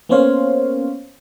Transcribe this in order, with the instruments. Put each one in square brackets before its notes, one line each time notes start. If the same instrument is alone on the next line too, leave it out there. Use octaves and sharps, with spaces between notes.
[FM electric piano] A#3 B3 C#4 C5 C#5 F5